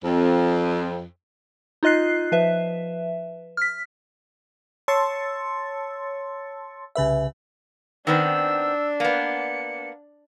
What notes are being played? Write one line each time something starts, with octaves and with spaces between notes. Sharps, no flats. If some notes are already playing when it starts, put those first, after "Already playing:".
F2
D#4 F4 D#5 F#6 C7
F3 B4 E5
F6 B6
C#5 A5 C6 E6 A6 C#7
C2 C#3 B4 E5
D#3 B3 C4 D4 E6
A#3 B3 C#7